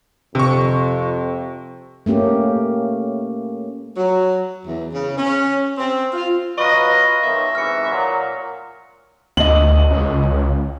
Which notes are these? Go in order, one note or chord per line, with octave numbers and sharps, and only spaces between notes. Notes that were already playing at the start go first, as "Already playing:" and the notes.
F2 C3 C#6
A3 A#3 C#4 G4
F#3
E2
C#3
C#4
C4
F4
F#3 F4 B4 D#5 C#6 A#6
B1 D#3 E5
G#2 C3 E3 F6 C#7
A#2 F#3
D2 D#5 F#7
C#2